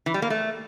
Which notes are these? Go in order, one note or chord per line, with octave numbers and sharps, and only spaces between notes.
E3
G3
A#3
A3